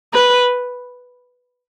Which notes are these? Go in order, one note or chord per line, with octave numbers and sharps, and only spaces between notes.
B4